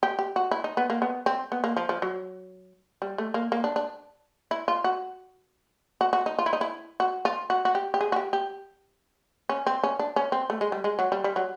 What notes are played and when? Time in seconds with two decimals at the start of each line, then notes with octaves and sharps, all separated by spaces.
0.03 G4
0.19 G4
0.36 F#4
0.51 E4
0.64 D#4
0.77 B3
0.90 A#3
1.02 B3
1.26 C4
1.52 B3
1.64 A#3
1.77 F3
1.89 F3
2.02 F#3
3.02 G3
3.18 A3
3.34 A#3
3.52 A#3
3.64 D4
3.76 D4
4.51 E4
4.68 F4
4.84 F#4
6.01 F#4
6.13 F#4
6.26 D#4
6.39 F4
6.46 E4
6.53 D#4
6.61 E4
7.00 F#4
7.25 F4
7.50 F#4
7.65 F#4
7.75 G4
7.94 G4
8.01 G#4
8.12 F#4
8.16 G4
8.33 G4
9.49 C#4
9.67 C4
9.83 C#4
9.99 D4
10.16 C#4
10.32 C4
10.50 A3
10.61 G#3
10.72 G3
10.84 G#3
10.99 F#3
11.12 G3
11.24 G3
11.36 F#3